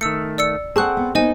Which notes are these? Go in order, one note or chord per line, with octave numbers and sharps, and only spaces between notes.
D#3 A3 E6 C#7
D5 E6 C#7
C4 G#4 F#5 A5 C#6 F#6
B3
A#3 B3 D#4 C5 D#5 G#5